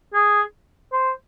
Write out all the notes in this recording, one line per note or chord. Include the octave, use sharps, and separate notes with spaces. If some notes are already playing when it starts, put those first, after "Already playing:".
G#4
C5